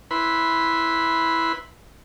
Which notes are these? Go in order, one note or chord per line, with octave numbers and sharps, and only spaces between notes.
E4 B4 B5 C6